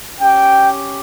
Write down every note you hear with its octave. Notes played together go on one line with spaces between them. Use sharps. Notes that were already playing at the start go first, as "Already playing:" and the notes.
C#4 G4 G5